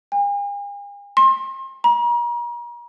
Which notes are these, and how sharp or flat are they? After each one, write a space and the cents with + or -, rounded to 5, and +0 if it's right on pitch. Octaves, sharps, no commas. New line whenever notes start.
G#5 -45
C6 +30
A#5 +40